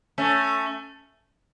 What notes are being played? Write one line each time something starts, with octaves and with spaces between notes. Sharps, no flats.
A3 C#4